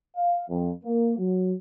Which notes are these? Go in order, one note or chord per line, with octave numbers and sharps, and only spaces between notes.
F5
F2
A#3
F#3